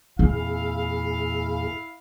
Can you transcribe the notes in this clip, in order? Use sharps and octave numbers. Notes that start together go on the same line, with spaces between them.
E2 A#2 C4 E4 G#4 F5